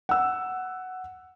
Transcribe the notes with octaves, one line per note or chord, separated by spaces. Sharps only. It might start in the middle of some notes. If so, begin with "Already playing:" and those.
F#5 E6